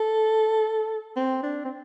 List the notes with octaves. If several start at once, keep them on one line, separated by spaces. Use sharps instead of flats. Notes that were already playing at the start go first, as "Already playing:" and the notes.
Already playing: A4
C4
D4
C4